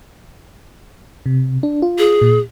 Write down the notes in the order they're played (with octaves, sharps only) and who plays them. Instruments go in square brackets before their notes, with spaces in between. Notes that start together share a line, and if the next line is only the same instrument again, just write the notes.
[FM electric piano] C3
D4
F4
[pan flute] G#4
[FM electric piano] A#2